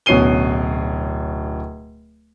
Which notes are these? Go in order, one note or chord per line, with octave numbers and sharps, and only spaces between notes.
D1 B2 C#4 C7 D#7 G7